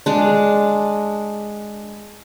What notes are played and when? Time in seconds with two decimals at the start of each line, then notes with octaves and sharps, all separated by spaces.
0.06 G#3 D4